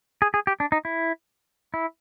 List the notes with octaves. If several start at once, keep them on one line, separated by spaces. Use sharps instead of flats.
G#4
G#4
G4
D4
D#4
E4
E4